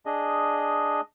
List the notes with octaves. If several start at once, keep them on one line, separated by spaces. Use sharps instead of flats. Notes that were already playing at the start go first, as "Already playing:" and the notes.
D4 G#4 D#5